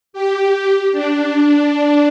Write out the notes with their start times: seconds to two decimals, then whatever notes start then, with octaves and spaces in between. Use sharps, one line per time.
0.13 G4
0.92 D4